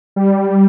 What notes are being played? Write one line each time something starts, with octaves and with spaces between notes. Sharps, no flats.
G3